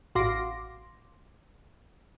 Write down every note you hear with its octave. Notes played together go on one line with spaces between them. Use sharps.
A1 F#4 F5 C6 D6 A#6